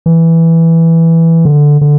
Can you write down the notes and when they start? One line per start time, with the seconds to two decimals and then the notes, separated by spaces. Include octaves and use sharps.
0.06 E3
1.45 D3
1.81 D3